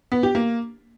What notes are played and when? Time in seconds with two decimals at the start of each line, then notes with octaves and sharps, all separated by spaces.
0.12 B3
0.23 G4
0.35 A#3